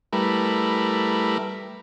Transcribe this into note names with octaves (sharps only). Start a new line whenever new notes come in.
G3 A3 E4 A#4 B4